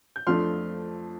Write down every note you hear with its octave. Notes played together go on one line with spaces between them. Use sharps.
G6
F2 F3 A3 D4 C6 F6